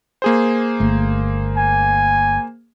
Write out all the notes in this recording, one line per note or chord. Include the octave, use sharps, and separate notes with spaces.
A#3 G#4 C5
G1 A3
G#5